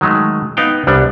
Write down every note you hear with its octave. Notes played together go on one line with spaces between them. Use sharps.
D#3 F#3 G#3 A3
B3 D#4 F5 G5
C2 G3 B3 D4